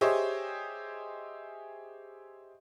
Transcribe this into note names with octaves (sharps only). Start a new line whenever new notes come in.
G4 G#4 C5 C#5 D#5 E5